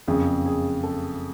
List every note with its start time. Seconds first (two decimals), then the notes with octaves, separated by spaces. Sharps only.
0.07 F#1 F2 C#3 G#4
0.46 G#4
0.84 A4